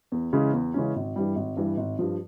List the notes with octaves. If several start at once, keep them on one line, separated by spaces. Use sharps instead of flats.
E2
C#3 E3 G#3 C#4
E2
C#3 E3 G#3 C#4
G#1
G2 E3 G3
G#1
G2 E3 G3
G#1
G2 F3